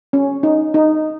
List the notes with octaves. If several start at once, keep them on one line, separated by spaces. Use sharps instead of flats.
C#4
D#4
D#4